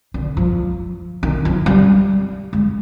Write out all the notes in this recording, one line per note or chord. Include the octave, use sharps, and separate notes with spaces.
D3
F3
D#3
F3
G3
G#3